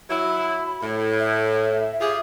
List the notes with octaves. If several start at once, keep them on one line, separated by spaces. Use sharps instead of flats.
F#3 E4 B5
A2
E5
F4 G4 G#4